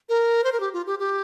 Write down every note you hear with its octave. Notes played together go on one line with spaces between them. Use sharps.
A#4
C5
A#4
G4
F4
G4
G4